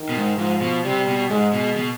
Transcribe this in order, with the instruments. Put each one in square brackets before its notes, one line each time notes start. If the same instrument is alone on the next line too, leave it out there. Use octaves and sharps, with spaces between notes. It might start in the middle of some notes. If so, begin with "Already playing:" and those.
Already playing: [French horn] D#3
[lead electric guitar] B2
G#2
[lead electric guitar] G#2 [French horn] F3
[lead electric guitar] B2
[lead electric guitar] C3 [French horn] G3
[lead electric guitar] B2
[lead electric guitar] G#2 [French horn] G#3
[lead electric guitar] B2
B2